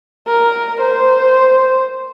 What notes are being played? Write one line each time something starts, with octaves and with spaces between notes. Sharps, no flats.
A#4
C5